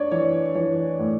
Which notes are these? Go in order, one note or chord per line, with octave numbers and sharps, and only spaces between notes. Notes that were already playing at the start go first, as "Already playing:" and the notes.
Already playing: D4 C#5 D5
E3 C#5
E3 C#5
A2